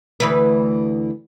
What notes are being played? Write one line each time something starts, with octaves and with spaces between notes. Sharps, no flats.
D2 E3 B4